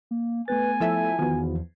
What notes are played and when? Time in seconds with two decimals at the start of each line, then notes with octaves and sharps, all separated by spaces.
0.11 A#3
0.48 A3 B3 B4 G#5 A6
0.80 F3 E4 A4 E5
1.19 E2 D#3 F3 B3 F#4